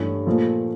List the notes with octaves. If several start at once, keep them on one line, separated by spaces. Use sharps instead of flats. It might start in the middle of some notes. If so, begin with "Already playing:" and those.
Already playing: G2 E3 A3 C#4
A#2 F3 A3